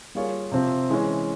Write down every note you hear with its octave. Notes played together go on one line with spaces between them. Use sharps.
G3 A#3 F4 G#4 C#5
C3 F3 C4
E3 G#3 C#4